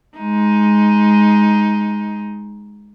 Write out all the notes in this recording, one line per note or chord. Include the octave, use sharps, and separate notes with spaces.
G#3 D#4